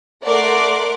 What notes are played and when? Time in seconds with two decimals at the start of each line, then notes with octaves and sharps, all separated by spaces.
0.23 A3 A#4 D5 F#5 C6 D6